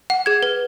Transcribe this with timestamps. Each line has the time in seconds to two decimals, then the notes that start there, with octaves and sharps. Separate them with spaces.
0.10 F#5
0.26 G#4 G#6
0.43 B4